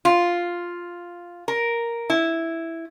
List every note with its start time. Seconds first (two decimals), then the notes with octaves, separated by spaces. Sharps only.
0.05 F4
1.48 A#4
2.10 E4